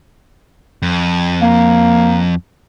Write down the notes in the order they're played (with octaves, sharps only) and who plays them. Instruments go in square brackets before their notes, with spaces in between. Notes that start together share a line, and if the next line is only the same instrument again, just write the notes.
[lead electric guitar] F2
[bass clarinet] A#3